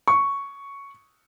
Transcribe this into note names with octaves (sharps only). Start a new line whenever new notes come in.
C#6